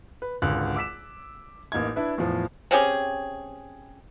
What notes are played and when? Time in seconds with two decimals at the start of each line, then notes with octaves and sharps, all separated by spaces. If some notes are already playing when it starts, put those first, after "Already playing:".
0.22 B4
0.42 G#1 C#2 D3 F#6
0.76 D6 E6 B6 E7
1.72 A1 A#3 D#4 G#6
1.96 D4 E4 B4
2.18 E2 A2 F3
2.71 C4 C#4 G4 G#4